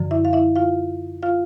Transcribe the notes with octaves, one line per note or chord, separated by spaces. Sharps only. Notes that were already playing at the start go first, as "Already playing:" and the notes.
Already playing: F#2 D3 F3
E4 E5
F5
E4 E5
F4 F5
F4 F5